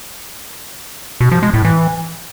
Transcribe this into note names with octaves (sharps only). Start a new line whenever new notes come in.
B2
F3
G#3
A2
E3